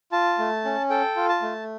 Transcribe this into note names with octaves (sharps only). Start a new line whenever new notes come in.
F4 A5
A3
C#4
A4 G5
F4
A5
A3